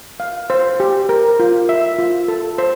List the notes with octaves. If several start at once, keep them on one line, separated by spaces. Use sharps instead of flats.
F5
C5
G4
A#4
F4
E5
F4
A4
C5